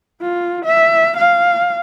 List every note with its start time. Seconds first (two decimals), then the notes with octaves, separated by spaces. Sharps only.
0.22 F4
0.65 E5
1.17 F5